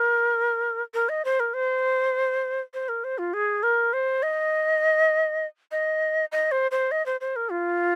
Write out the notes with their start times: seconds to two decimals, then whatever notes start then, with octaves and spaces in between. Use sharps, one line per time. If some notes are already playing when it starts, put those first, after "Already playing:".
Already playing: A#4
0.94 A#4
1.09 D#5
1.25 C5
1.40 A#4
1.54 C5
2.74 C5
2.89 A#4
3.04 C5
3.18 F4
3.33 G#4
3.63 A#4
3.93 C5
4.23 D#5
5.72 D#5
6.32 D#5
6.51 C5
6.71 C5
6.91 D#5
7.06 C5
7.21 C5
7.36 A#4
7.51 F4